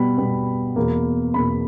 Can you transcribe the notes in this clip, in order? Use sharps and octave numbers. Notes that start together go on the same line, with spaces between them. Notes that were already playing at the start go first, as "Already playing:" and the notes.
Already playing: B2 G3 B3 B5
B2 G3 B3
E2 B2 A#3
E2 B2 A#3 B5